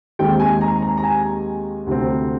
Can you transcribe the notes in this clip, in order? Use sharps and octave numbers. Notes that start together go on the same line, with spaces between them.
D#2 D#3 G#3 C4 G5
G#5
A#5
A#5
A#5
G#5
D2 C3 G3 C4